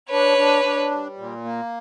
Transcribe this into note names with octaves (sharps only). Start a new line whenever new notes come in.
D4 B4 C#5
D4
D4
G3
A#2
A#3